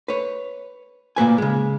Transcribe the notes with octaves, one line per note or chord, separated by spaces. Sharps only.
B4 C#5
A#2 A#3 B4 G#5
C#3 G#3